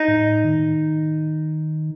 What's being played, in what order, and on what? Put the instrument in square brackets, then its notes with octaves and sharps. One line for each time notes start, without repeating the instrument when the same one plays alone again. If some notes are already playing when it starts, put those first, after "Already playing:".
Already playing: [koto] D#4
[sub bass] A2
D#3